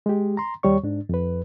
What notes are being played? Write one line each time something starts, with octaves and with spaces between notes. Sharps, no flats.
G#3 G4
A#5 C6
D#2 G3 C#5 C#6
G#2 D4
F2 B4